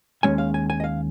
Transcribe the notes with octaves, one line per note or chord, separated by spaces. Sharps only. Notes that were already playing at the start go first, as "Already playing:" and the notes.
D#2 D#3 G#3 C#4 G#5
F5
G#5
G#5
D#5
F5